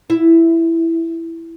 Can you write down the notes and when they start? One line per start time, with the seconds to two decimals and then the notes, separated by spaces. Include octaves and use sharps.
0.10 E4